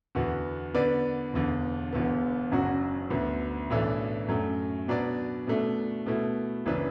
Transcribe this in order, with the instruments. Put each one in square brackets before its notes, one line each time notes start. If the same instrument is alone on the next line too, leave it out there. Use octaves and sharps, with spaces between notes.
[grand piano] E2 D3 B3 F#4
D3 B3 D4 B4 D5
E1 E2 D3
E1 E2 D3 B3
F#1 F#2 F#3 D4 F#4
D2 D3 B3
B1 A2 E3 D4 A4
F#2 F#3 A3
B2 F#3 D4 B4 D5
B2 A3 D4
B2 A3 E4
F#1 E3 D4 B4